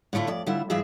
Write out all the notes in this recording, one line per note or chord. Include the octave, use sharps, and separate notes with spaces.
A2 D3 A3 E4 F4
F2 D5
D3 G3 E4 F4 E5
G2 E3 G#3 F4 G#4 E5